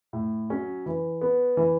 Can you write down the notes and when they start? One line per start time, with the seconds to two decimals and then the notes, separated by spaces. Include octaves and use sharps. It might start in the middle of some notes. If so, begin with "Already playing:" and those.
0.13 A2
0.50 F#3 C#4
0.86 E3
1.21 B3
1.57 E3